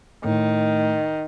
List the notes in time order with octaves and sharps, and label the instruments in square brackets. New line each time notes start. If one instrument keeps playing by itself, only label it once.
[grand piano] A2 [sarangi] D#3